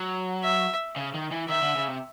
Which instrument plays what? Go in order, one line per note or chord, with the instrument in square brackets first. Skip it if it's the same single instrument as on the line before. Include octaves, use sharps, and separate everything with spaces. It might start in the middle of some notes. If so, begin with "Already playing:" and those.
Already playing: [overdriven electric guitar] F#3
[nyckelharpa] E5
[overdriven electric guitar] C#3
D#3
E3
[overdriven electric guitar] D#3 [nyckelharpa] E5
[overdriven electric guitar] D3
C#3
C3